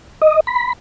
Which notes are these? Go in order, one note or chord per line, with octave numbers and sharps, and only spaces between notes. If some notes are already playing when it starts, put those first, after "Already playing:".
D#5
B5